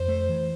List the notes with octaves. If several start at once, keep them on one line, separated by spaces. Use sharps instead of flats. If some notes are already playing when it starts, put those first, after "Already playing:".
Already playing: F2 C5
A3
E3